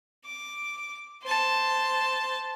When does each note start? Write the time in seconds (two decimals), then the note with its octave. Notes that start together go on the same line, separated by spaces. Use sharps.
0.25 D6
1.23 C5 A5